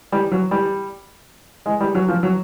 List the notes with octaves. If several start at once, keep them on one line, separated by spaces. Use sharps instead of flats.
G3
F#3
G3
G#3
G3
F#3
F3
F#3